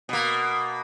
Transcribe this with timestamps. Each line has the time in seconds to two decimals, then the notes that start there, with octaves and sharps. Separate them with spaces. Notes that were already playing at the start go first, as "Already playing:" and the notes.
0.09 B2 A#3